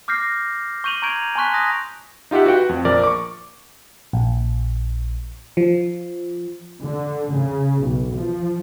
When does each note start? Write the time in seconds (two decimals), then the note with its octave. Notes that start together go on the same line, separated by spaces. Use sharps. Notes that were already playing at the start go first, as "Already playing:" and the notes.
0.08 D6 F6 G6 A#6 C7
0.84 C#6 G6 D#7 F7 F#7
1.02 A#5 C#6 G6 G#6 D7 F7
1.35 G#5 A5 C6 C#6 F#6 B6
1.54 D#6 G#6 A#6
2.31 D#4 F4 G4 E5 F#5
2.46 F#4 B4 F#5 G5
2.69 F2
2.85 A#1 F3 A#4 D5
3.04 C#6 D6
4.13 A#1
5.57 F3
6.83 D3
7.34 C#3
7.82 B1
8.15 F3